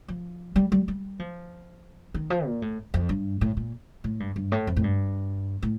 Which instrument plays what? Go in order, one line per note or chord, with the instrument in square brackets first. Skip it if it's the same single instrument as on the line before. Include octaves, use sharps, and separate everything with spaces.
[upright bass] F3
G3
G3
G3
F3
D#3
F3
A#2
A2
F2
G2
A2
A#2
A2
G2
G2
A2
F2
A2
G2
A2